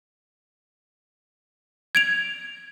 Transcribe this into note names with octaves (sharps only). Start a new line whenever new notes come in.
G#6 D7 F7